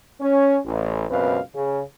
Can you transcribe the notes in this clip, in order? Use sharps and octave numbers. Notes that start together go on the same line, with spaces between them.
C#4
A1
C#2 F#2 B2 C4 B4 F5
C#3